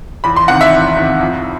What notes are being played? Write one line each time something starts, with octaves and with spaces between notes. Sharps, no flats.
E2 B5
C6
C3 D#3 F#5
E5
E2
C3 D#3
F2